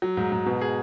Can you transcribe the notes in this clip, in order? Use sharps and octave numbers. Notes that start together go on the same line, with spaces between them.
F#3
G#2
G#2
B2
G#4